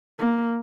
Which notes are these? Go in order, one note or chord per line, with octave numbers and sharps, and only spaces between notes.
A#3